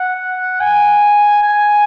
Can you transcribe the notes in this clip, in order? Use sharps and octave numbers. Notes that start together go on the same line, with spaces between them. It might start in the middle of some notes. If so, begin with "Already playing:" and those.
Already playing: F#5
G#5
G#5